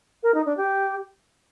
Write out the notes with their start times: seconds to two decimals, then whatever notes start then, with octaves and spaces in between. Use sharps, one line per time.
0.23 A#4
0.34 D#4
0.46 D4
0.57 G4